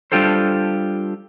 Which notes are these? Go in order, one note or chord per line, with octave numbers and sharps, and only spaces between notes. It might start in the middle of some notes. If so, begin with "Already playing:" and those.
G3 D4 F4 G4 A4 C5